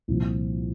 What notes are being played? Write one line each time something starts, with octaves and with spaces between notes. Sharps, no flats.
C2 A#2 F3